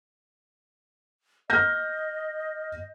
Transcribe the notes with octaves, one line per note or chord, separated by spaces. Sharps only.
D#5 F6 G6 A#6